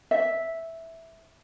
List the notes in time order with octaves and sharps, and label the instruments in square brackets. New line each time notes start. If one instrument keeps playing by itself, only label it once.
[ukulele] E5